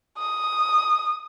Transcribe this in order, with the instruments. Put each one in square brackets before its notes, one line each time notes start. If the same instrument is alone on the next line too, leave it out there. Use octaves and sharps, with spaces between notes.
[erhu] D#6